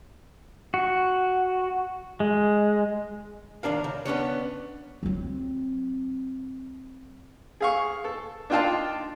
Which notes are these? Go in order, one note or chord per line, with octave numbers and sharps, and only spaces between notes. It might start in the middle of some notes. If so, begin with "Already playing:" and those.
F#4
G#3
D#2 C3 D4 A#4 F5
C#3
B3 C#4 D4 C#5
F#3 C4
G#4 F5 C#6
A4
D4 D#4 F4 G5 A5 C6